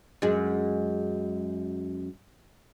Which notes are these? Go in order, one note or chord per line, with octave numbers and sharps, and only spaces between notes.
F#2 G#3